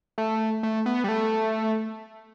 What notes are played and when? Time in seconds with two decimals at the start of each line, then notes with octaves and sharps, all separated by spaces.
0.18 A3
0.63 A3
0.86 B3
1.04 G3
1.09 A3